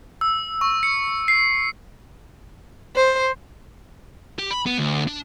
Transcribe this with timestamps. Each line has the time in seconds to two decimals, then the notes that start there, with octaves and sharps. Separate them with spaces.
0.21 E6
0.61 C#6
0.83 C#7
1.28 C7
2.96 C5
4.39 G4
4.51 B5
4.66 B3
4.78 D2
5.08 D4